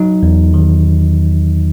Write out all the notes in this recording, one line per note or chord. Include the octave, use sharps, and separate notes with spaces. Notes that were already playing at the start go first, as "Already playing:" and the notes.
Already playing: F#3 D#4
E2
D#3